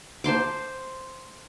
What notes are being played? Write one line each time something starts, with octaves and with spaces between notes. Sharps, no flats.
C5 A5 C6 D6